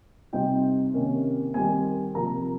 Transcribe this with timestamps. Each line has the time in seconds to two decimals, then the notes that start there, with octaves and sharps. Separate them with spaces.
0.33 C3 G3 C4 D#4 G5
0.94 C3 D#3 A#3 C#4
1.54 D#3 G3 C4 G#5
2.15 C3 F3 A#3 A#5